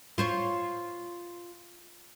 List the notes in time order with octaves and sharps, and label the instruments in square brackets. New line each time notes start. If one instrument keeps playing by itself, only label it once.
[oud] F4 C5 C#5